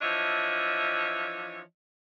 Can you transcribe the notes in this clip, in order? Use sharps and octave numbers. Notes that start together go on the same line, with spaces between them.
E3 F3 D4 C#5 D#5 E5